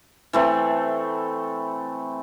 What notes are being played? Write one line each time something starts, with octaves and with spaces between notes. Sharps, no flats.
E3 A3 C4